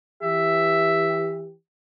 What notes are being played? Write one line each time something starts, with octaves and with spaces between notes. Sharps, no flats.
E3 G4 E5